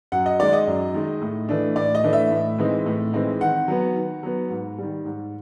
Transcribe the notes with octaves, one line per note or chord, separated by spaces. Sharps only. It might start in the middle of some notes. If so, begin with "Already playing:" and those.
F#2 F#5
D#5
D#3 G#3 D5
D#5
F#2
D#3 G#3
A2
E3 A3 D4
A2 D5
D#5
E3 A3 D4
E5
A2
E3 G#3 C4 D#4
A2
E3 G#3 C4 D#4
D#3 F#5
F#3 B3
D#3
F#3 B3
G#2
D#3 G3
G#2